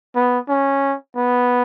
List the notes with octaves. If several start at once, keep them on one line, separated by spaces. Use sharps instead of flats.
B3
C#4
B3